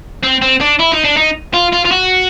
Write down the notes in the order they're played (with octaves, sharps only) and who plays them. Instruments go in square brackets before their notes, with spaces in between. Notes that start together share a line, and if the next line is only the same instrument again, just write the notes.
[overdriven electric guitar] C4
C4
D4
E4
D#4
D4
D#4
F4
F4
F4
F#4